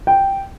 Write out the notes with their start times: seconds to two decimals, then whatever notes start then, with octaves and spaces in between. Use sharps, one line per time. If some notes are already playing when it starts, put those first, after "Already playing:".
0.07 G5